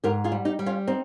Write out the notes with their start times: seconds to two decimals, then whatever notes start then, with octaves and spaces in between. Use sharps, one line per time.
0.04 G#2 G4 A#4
0.24 F4 G#4
0.32 G3
0.45 D#4 G4
0.59 G3
0.66 C#4 F4
0.87 C4 D#4